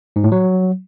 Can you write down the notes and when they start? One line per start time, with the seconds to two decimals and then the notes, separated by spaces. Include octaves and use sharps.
0.16 G#2
0.24 A2
0.32 F#3